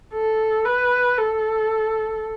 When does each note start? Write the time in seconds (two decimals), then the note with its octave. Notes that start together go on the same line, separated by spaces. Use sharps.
0.14 A4
0.65 B4
1.18 A4